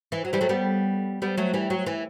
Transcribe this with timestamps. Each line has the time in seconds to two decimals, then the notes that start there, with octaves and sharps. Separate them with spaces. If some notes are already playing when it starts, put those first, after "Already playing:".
0.12 E3
0.25 F#3
0.33 E3 G3
0.41 F#3 A3
0.49 G3 B3
1.22 G3 B3
1.38 F#3 A3
1.54 E3 G3
1.70 F#3
1.86 E3